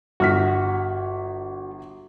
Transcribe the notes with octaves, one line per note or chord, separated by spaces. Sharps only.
G1 F#4 F6 B6